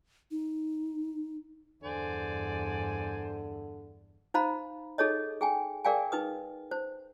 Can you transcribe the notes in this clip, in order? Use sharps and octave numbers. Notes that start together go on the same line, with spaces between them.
D#4
E2 G2 D3 C5 D5 G#5
D#4 C5 F5 A#5 B5
D#4 G#4 A4 C#5 D#5
G#4 G5 G#5
G#4 A#4 D5 F5 G5 G#5
D#4 B4 D#6
C5